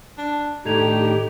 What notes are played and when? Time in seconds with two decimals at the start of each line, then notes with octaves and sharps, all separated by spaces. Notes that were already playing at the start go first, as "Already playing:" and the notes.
0.18 D4
0.65 A2 D#3 D4 D#4 G4 A4 G#6 F7